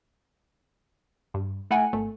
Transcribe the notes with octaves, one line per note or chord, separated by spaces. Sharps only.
G2
A3 E4 F#5 G#5
G#1 A3